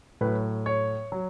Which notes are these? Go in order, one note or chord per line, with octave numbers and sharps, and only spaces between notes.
A2 F#3 B4
C#5
F#3